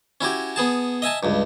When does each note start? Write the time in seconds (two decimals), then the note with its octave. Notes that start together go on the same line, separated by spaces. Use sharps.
0.21 C#4 E4 F#4 G4
0.56 B3 G#4 A5
1.02 D#5 E5 G#5 A5
1.23 C#2 G2